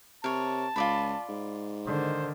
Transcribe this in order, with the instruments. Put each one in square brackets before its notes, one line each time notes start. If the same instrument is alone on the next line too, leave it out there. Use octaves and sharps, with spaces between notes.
[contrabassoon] C3 [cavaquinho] A#4 C#5 [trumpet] A5
[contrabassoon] C#2 [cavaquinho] F4 D5 B5
[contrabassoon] G#2
[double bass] D3 D#3 [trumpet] C5